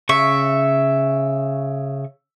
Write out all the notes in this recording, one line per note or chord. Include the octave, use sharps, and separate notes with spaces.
C#3 E5 C#6